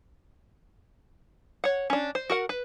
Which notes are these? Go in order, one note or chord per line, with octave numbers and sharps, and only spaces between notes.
C#5 F#5
C#4 D4
C5
F#4 A#4 F#5
B4